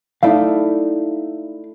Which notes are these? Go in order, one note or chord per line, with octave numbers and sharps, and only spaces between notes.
A3 D#4 E4 D5 F5